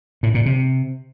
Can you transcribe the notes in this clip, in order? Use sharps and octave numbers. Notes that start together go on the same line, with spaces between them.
A2
A#2
C3